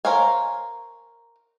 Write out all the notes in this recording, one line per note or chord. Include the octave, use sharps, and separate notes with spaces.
A#4 C5 C#5 F5 G#5